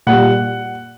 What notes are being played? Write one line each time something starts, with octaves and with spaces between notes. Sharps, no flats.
A#2 G3 F#5